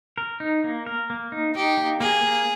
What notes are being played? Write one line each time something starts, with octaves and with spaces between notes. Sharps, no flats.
A#4
D#4
A#3
A#4
A#3
D#4
D#4 G4
A#3
A#3 G#4
A#3